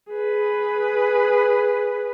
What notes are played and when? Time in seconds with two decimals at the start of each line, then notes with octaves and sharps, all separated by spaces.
0.10 G#4 B4